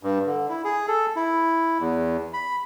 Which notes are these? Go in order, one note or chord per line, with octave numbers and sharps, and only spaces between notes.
G2
D3
E4
G#4
A4
E4
E2
B5